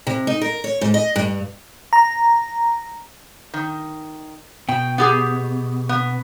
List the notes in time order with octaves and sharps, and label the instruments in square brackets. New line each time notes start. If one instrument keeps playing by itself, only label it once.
[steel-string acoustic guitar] C3
D#4
A#4
C#5
G#2
D#5
G2
[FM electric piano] A#5
[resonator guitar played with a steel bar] D#3
[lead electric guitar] B2 [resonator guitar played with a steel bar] G5
[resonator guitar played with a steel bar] B3 G4 G#4
B3